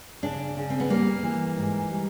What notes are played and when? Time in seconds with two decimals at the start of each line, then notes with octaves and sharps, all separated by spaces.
0.23 C#3 D4
0.57 C#3
0.70 C4
0.80 B3
0.90 G3 A#3
1.23 E3
1.58 G#2
1.90 G3